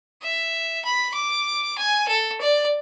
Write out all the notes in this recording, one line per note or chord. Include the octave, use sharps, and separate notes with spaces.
E5
B5
D6
G#5
A4
D5